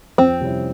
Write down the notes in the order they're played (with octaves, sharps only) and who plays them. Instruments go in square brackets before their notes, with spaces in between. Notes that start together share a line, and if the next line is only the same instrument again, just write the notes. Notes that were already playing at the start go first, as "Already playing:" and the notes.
[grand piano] F2 [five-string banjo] C4
[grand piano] C3 G3 C#4 E4